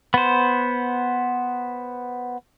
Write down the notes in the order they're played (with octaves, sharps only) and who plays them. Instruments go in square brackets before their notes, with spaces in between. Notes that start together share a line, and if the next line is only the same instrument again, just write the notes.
[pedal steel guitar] B3 C5